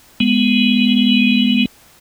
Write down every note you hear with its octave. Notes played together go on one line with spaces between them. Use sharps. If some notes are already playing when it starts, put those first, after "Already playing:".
G#3 B3